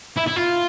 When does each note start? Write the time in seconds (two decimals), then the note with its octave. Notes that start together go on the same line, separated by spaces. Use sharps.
0.17 E4
0.27 E4
0.36 F4